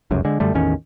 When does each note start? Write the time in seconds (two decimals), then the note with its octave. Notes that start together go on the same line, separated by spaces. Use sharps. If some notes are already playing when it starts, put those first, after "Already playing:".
0.11 F1 C#2 F#2
0.25 D3 G#3
0.40 F#2 D3 G3 A3
0.54 A1 E2 D#3 C#4